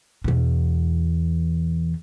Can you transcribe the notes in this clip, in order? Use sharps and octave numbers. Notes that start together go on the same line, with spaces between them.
E2 B2